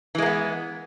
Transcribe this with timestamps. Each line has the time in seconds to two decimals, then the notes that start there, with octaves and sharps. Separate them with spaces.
0.15 E3
0.18 G#3
0.22 A#3
0.26 B3